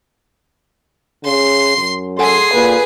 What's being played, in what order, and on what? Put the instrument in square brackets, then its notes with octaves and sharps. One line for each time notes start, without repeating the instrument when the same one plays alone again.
[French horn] C#3 [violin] C6 C7
[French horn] F#2
[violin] G#4 C7 [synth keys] A4 F#5 G#5 [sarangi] C6
[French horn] A#2 [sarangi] B4